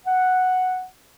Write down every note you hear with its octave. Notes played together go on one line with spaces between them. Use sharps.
F#5